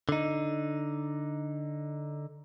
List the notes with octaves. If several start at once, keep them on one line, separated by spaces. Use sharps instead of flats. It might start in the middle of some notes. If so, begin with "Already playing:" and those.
D3 D#4